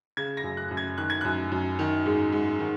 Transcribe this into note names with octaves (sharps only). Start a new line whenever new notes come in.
C#3 G#6
A#6
F#2
F#6
F#2
G#6
D#3 F#6
G#6
F#2 F#6
F#2
D#3
G#2
G#2
D#3